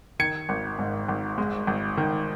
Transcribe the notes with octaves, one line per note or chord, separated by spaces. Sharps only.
D#3 G#6 C#7
G#1
G#2
G#1
G#3
G#1
D#3